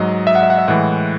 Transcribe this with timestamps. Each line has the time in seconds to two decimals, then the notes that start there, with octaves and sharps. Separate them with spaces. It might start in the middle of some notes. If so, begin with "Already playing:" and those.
Already playing: G#2 F#3 D#5
0.27 E5
0.35 F#5
0.43 E5
0.50 F#5
0.58 E5
0.68 A2 E3 G#3 F#5